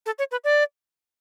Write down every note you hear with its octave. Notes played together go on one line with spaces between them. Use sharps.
A4
C#5
B4
D5